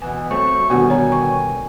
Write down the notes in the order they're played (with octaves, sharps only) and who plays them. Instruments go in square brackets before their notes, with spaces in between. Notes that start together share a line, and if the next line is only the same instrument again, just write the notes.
[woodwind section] B2 E3 B3 [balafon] G#5
[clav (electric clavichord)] F#3 A3 C4 [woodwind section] C#5 E5 C#6
[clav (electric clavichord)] B2 D3 G3 [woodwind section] D#3 G#5 [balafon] B3 F#4 F#5
[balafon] C#5 A#5
C#6